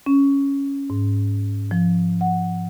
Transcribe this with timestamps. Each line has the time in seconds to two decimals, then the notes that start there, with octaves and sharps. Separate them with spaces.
0.06 C#4
0.90 G#2
1.71 F3
2.21 F#5